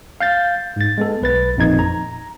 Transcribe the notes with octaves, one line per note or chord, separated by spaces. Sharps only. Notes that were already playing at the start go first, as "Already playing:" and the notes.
F5 G6 A6
G#2 A6
G#3 B3 A4
B1 B4 A6
G#1 F2 A#2 D#4 G#6
A#5